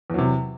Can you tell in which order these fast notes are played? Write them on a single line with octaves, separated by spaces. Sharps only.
E2 F#3 C3